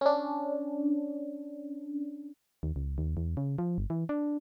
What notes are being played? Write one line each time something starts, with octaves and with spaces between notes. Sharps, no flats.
C#4 D4
D#2
C#2
D#2
E2
C#3
F3
G1
E3
D4